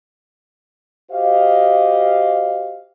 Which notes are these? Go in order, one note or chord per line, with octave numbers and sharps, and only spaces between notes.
F#4 G4 C5 D#5 F5